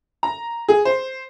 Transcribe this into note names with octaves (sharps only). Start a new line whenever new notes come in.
A#5
G#4
C5